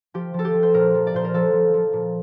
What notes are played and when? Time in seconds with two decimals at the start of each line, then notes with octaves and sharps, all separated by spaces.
0.14 F3 G4
0.34 F3
0.39 A4
0.45 G4
0.54 F3
0.63 C5
0.74 A#2 A#4
0.94 F3
1.07 D5
1.14 A#2 C5
1.24 A#4
1.34 F3 A4
1.53 F3
1.73 F3
1.93 A#2